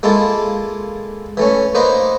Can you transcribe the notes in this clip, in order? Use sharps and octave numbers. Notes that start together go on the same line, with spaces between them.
G#3 A#3 E4 F4 A4
E3 A3 C#4
A#3 D#4 B4 C5 A#5